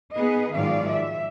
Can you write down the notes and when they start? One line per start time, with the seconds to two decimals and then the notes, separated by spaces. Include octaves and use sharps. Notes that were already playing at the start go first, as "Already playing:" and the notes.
0.14 B3 D#4 G#4 B4 D#5
0.55 G#2 D#3 F3 F#3 D5 F5
0.91 E5